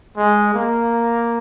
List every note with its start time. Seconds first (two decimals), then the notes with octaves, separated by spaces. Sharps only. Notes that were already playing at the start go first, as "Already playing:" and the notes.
0.17 G#3
0.54 A#3